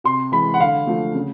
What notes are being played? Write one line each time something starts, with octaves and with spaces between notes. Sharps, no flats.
C3 C6
E3 G#3 B5
F#5
D3 F5
F3 A3
C#3